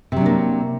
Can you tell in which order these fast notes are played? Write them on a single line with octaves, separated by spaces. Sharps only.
C3 F#3 D4 A#3